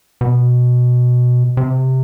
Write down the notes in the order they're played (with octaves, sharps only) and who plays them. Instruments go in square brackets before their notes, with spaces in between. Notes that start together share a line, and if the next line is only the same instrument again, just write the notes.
[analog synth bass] B2
C3